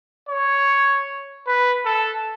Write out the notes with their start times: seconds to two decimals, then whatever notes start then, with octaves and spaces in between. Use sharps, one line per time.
0.29 C#5
1.47 B4
1.85 A4